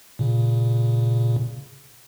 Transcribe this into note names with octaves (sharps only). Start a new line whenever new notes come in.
A#2 C#3